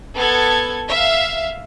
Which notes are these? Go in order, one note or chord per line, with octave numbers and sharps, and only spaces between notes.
B3 A4 G#6
E5 F5